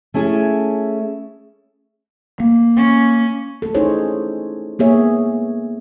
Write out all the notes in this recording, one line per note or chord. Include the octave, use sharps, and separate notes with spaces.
A3 C#4 E4 G#4 A4
A#3
C#4
A3 A4
C#4 D#4 E4 G#4 C5 C#5
A#3 B3 G#4 C#5 E5